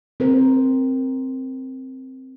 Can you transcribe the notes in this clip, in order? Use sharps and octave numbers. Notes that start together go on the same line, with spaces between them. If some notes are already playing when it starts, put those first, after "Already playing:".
C4 A#4 C5